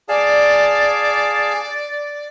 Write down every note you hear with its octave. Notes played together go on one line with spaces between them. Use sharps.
G#4 D5 F5 A5